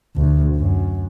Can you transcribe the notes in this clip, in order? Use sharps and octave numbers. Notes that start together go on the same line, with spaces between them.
D2
F#2